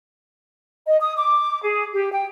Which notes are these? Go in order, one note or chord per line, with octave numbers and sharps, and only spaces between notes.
D#5
D#6
D6
G#4
G4
G5